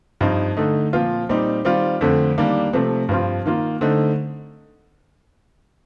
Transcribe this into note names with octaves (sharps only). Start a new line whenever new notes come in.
G2 F3 C4 D#4
D3 A3 D#4
A#2 F3 C4 F4
A#2 G3 C4 D#4
D#3 G3 C4 F4
F2 D3 A3 C4
D#3 G3 A#3 D4
C3 F3 A3
G2 F3 C4 F4
D#3 A#3 F4
D3 A3 C4 D#4